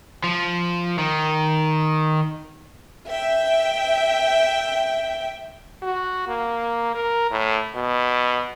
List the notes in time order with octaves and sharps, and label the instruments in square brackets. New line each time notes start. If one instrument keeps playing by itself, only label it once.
[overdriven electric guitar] F3
D#3
[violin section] E5 G5
[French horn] F#4
A#3
A#4
A2
B2